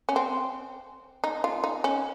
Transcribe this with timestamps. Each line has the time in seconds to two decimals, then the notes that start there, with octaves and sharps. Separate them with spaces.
0.09 C#4
0.16 C4
1.24 D#4
1.44 F4
1.64 D#4
1.84 C#4